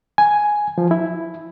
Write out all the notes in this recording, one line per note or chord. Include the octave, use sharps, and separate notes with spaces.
G#5
F3
E4